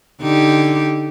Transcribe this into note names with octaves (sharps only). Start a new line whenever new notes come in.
D3 D#4 G4